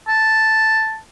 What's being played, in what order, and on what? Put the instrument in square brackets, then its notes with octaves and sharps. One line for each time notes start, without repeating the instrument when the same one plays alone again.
[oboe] A5